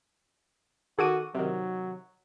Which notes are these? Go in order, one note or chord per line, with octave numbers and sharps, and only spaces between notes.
D#3 F#4 G#4 A4 D6 D#7
C3 D#3 F#3